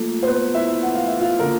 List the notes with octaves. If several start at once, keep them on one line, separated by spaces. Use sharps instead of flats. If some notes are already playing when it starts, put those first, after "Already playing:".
Already playing: F3 A3 A#3
C5
B3 B4
E4 E5
F#5
F5
E5
F4 F5
D3 F3 A#3 A#4 A#5